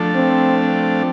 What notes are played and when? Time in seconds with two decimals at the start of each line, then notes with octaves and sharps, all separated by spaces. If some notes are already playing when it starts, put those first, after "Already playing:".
Already playing: F3 A3 D4 A4
0.15 C4
0.59 C4